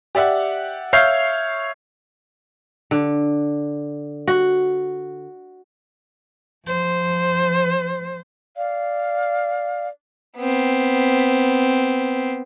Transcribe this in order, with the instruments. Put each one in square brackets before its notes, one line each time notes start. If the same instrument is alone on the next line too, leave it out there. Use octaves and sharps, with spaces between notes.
[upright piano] G4 D5 E5 F#5
C#5 E5 F5 F6 G6 C7
[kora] D3
F#4
[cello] F3 C5
[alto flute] D5 [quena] F5
[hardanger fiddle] B3 C4